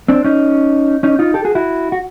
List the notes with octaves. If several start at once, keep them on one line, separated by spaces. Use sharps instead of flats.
C4 D4
C#4 D#4
C#4 D#4
D#4 F4
G4 A4
F#4 G#4
E4 F#4
F#4